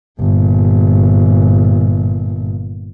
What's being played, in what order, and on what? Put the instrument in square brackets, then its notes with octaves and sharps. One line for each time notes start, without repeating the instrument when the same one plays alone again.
[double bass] G1 A#2